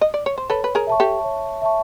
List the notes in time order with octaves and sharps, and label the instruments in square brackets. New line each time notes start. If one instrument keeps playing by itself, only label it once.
[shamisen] D#5
D5
C#5
C5
[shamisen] A4 B4 [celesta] C#5
[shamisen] B4
G#4 A#4
[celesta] E5 A5 C#6
[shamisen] G4 A4
[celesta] C#5
E5 A5 C#6